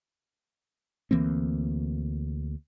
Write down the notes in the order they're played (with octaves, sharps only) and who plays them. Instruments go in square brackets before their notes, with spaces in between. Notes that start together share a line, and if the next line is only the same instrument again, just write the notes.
[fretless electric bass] D2 E3 A#3 C4